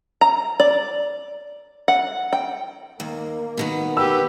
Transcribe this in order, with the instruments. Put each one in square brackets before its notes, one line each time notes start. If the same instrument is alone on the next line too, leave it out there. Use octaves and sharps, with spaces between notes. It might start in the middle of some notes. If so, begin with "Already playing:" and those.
[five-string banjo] A#5
D5
F#5
G5
[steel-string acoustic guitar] D#2 [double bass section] A#3
[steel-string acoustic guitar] B2 D#3 B3
[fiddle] G4 B4 [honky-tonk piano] E6